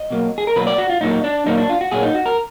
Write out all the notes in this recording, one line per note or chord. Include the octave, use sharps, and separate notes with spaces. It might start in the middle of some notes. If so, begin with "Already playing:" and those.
Already playing: D#5
B2 F#3 A#3
G#4
A#4
B2 F#3 A#3 B4
D5
F#4
F4
A#2 F#3 A#3 D#4
D4
A#2 F#3 A#3 D#4
D4
F4
F#4
A#2 F#3 A#3 G#4
D#4
F#4
A#4